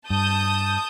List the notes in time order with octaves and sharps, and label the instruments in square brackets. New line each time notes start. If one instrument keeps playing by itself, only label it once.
[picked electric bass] G2 [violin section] A5 D#6 G6